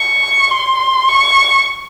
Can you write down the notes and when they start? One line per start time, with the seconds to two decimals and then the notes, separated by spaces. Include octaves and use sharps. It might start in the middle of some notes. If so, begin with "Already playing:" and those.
Already playing: C#6
0.50 C6
1.08 C#6